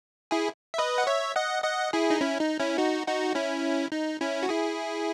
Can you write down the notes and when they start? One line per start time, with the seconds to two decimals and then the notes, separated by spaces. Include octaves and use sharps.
0.31 E4 G#4
0.74 E5
0.78 B4 D#5
0.98 F#5
1.07 C#5 E5
1.36 D#5 F#5
1.64 D#5 F#5
1.93 E4 G#4
2.10 D#4
2.21 C#4 E4
2.40 D#4
2.60 C#4 E4
2.78 D#4 F#4
3.07 D#4 F#4
3.35 C#4 E4
3.92 D#4
4.21 C#4 E4
4.43 F#4
4.49 E4 G#4